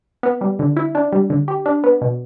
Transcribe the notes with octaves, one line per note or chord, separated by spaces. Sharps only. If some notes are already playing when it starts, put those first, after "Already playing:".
B3
G3
D3
E4
D4
G3
D3
G4
D4
B3
B2